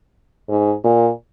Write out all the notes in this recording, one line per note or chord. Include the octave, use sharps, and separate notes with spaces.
G#2
A#2